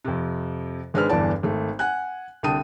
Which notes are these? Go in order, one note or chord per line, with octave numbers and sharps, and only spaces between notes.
F2 C3
G#1 G#3 D4 B4 C5 F6
G1 E2 G2 E3 D5 A5
G#1 A3
F#5 G#5 F#6
C2 D3 G5 A5 D#6 D#7